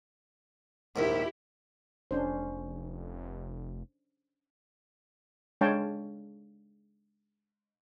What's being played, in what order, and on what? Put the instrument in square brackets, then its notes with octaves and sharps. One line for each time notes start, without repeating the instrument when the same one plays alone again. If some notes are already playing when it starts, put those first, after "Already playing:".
[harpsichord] A#1 D#2 G#2 [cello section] E4 G4
[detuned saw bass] F1 [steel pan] C#4 D4 C5
[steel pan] G#3 D4 C#5 F5 G5 A5